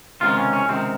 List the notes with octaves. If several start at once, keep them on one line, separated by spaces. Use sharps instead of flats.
C#2 C3 D#3 F4
C#4
C#4
C#2 C3 D#3 C4